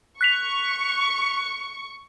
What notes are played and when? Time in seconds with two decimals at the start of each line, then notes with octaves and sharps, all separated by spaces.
0.21 C#6 F#6 B6 F7